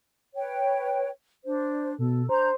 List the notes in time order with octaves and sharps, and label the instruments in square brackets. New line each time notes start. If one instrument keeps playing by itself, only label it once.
[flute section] B4 C#5 G5
D4 C5
[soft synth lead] B2 [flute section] A4
[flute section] D4 A#5 G6 [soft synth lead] C5